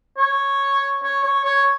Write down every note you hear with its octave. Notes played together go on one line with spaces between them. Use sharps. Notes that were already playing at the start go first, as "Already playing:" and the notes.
C#5
C#5
C#5
C#5